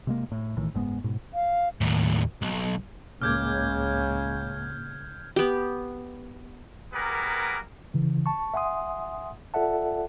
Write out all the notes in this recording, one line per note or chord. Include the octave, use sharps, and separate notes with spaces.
C3 G#3 A#3
A2
B1 A2 D#3 E3
F#1 G#2 G#3 B3
G#2 B2
F5
D#2 A2
B1
C#2 A2 C#3 A#3 D6 F6 G6 G#6
B3 G4
G3 A#3 B3 G#4 A#4 B4
C#3 E3
A5 C#6
E5 F#5 G#5 C6 D#6
F4 A4 D5 E5 F#5 A5